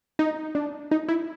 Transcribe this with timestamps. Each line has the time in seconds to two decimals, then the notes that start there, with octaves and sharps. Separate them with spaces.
0.19 D#4
0.55 D4
0.91 D#4
1.08 E4